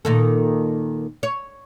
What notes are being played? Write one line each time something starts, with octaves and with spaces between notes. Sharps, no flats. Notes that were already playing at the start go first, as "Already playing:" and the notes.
A#2 D#3 A4
C#5